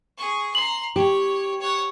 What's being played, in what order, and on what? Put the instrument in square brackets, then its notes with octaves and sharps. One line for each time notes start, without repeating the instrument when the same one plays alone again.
[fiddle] G#4 C#6
[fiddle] A#5 C6 [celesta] F#7
[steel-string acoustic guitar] G4 [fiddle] C#5
[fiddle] C#5 F#5